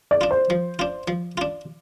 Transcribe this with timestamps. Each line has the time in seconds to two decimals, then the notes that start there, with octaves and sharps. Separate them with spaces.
0.11 D5
0.21 D4 F4
0.31 C5
0.50 F3
0.79 D4 F4
1.08 F3
1.37 D4 F4